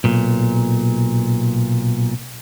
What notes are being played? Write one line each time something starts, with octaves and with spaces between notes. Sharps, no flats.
B1 A#2